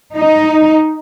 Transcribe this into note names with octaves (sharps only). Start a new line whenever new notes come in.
D#4